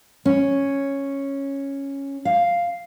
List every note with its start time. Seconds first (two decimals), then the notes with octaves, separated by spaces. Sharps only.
0.26 C#4
2.25 F5